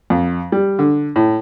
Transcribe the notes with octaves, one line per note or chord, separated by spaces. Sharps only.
F2
G3
D3
A2